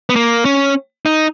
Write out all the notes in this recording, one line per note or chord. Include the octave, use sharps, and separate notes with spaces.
B3
A#3
C#4
D#4